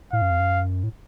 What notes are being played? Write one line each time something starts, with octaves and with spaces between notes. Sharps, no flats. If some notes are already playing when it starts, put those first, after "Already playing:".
A2 F5
F#2
F2
F#2
A2